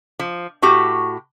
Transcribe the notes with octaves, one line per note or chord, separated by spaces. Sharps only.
F3
A2 F#4 G4